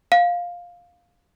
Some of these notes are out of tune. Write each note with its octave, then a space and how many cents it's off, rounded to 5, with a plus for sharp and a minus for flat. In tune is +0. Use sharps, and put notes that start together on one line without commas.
F5 +10